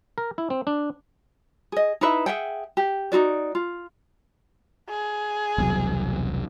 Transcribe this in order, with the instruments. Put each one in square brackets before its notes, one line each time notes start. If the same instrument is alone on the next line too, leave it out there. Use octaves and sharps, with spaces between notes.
[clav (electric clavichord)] A#4
E4
C4
D4
[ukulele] G#4 D#5
D#4 E4 B4 E5
G#4 E5 F#5 G5
G4
D#4 F4 F#4 D5
F4
[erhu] G#4
[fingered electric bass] E1 C2 F#3